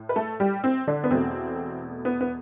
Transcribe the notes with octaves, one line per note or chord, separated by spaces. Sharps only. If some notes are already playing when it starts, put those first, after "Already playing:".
Already playing: A2
B4
A3 A4
G3 G4
C4
D3 D4
B3
E2 B2 A3 C4
B3
B3